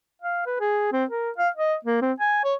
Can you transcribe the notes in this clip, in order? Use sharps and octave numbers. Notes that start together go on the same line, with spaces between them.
F5
B4
G#4
C4
A#4
F5
D#5
A#3
C4
G#5
C#5